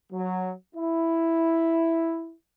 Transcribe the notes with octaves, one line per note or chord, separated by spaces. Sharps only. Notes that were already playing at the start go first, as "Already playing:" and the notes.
F#3
E4